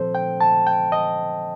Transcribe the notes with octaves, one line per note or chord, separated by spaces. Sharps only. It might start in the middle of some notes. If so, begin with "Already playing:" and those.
Already playing: A#2 F3 C4 A4 C5
G5
A5
G5
D#5